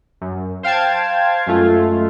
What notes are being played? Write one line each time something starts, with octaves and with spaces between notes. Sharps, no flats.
F#2
C5 F5 G5 A5 G#6
F#2 G#3 A3 F4